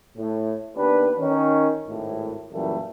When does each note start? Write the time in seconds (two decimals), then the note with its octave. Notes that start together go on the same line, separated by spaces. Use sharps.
0.17 A2
0.77 D#2 B3 D4 G4 B4
1.19 D#3 C#4
1.88 G#1 A2
2.53 F#2 A#2 E3 G3 A3 A#3